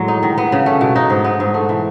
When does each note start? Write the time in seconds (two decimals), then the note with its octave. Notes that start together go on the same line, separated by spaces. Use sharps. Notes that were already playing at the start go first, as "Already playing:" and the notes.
Already playing: A2 F#3 G#3
0.08 D#4
0.23 D#3
0.38 B3
0.52 C#3
0.66 A3
0.81 B2
0.96 D#4
1.10 G#2
1.24 B3
1.40 G#2
1.54 A3
1.69 E3